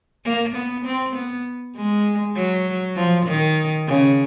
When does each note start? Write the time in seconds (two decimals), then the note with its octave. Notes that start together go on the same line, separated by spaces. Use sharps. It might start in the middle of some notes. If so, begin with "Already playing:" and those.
0.25 A#3
0.56 B3
0.85 C4
1.16 B3
1.76 G#3
2.36 F#3
2.96 F3
3.27 D#3
3.87 C#3